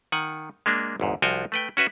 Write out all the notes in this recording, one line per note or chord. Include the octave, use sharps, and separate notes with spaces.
D#3 F#5 G#5
G#3 A#3 D4
G1 E2 G#2
C2 F3 F#4 F5 G5 G#5
A3 B4 G5
C#4 F#4 B4 E5